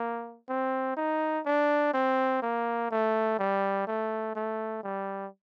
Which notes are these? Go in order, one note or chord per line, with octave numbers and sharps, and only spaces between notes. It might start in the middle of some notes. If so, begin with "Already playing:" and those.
Already playing: A#3
C4
D#4
D4
C4
A#3
A3
G3
A3
A3
G3